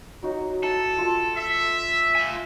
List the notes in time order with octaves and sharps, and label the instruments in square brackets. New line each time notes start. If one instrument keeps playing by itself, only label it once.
[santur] F#3 D#4 F#4
[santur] E4 [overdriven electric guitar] A4
[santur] F4 A5
[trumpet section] E5
[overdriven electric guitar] F4 G#5